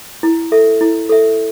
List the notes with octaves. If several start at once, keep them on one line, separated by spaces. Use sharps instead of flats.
E4
A4 E5
E4
A4 E5